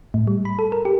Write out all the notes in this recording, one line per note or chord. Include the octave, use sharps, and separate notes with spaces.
A2
G3
B5
A4
A#4
G4